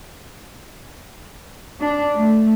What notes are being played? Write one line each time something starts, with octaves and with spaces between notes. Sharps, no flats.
D4
A3